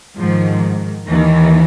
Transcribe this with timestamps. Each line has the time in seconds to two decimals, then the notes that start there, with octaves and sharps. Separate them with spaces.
0.17 G#2 D#3 F3
1.07 D#2 D#3 E3